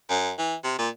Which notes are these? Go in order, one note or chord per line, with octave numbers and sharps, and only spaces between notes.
F#2
E3
C3
A#2